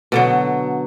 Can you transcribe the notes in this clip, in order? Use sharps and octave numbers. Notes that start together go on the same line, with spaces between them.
B2 D3 F#3